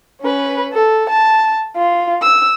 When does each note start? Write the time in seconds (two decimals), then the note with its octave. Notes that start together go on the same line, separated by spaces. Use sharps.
0.21 C#4 B4
0.73 A4
1.09 A5
1.77 F4
2.22 E6